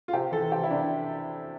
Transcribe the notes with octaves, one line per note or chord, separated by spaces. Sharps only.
F4
C3 G4
E3 A4
C3 G4
E4
C3 D4